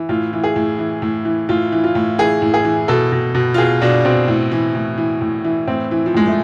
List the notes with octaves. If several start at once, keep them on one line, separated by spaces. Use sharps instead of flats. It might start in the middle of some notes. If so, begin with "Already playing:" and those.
Already playing: E3
A2 F4
E3
G#4
A2
E3
A2
E3
A2 F4
E3
F4
A2
E3 G#4
A2
G#4
E3
B2 A4
B2
B2
F4
B2 G#4
B2 D4
B2 C4
A2
E3
A2
E3
A2
E3
A2 C4
E3
F3
A2 G#3
A3